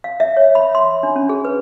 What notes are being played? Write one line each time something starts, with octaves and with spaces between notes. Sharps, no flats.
F5
E5
C#5
B5
C6
D4
C#4
G#4
B4